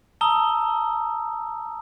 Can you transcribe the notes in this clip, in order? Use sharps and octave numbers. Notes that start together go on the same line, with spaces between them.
A5 A#5 D#6 E6 G7